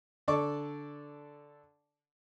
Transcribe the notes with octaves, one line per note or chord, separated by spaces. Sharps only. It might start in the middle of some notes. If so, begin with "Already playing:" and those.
D3 A4 D5 A5 C#6 D6